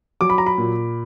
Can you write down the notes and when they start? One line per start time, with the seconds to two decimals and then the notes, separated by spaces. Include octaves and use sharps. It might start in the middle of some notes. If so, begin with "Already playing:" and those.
0.21 F#3 D6
0.30 B5
0.38 A#5
0.47 B5
0.58 A#2